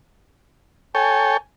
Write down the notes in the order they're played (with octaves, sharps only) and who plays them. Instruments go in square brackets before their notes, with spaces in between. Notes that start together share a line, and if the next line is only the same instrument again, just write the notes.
[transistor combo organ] A4 C#5 G5 [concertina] G#5